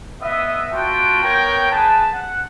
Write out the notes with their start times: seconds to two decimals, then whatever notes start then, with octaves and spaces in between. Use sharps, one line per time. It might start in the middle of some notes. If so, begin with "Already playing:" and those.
0.22 B3 D#5 E5
0.73 B3 F4 F#4 G5 A5
1.23 B3 A#4 C#5 G5
1.71 G#4 B4 A5
2.13 F#5